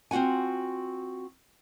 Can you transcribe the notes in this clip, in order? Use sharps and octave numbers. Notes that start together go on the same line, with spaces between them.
C4 F4 F#4 F#5 G#5